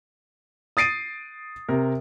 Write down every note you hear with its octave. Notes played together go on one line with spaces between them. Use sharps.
D#6 A6 C7 D7 D#7
C3 A#4